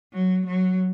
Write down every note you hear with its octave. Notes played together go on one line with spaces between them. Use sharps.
F#3
F#3